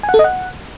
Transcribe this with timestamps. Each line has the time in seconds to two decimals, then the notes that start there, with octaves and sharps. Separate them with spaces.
0.03 G#5
0.09 F#5
0.14 A4
0.19 D#5
0.24 F#5